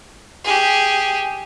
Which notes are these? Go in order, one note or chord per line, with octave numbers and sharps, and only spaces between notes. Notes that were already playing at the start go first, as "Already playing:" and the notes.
G4 G#4